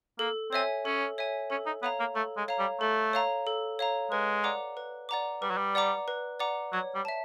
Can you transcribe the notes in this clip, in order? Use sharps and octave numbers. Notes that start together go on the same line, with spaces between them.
A#3 A4
C4 C#5 E5 G#5
C#4 A4
C#5 E5 G#5
C#4 A4
D#4
B3 C#5 F5 A#5
A#3
A3 A4
G#3
C#5 F5 A#5
G3
A3 A4
C#5 F5 A#5
A4
C#5 F5 A#5
G#3 B4
D5 F#5 A#5 D6
B4
D5 F#5 A#5 D6
G3 B4
F#3
G3
D5 F#5 A#5 D6
B4
D5 F#5 A#5 D6
F#3 C#5
G3
E5 A5